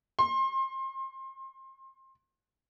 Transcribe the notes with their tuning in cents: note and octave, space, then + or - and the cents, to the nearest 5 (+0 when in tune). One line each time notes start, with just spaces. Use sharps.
C6 +30